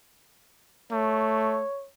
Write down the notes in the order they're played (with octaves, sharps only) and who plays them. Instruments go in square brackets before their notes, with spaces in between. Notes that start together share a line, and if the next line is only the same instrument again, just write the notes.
[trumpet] A3 [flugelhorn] C#5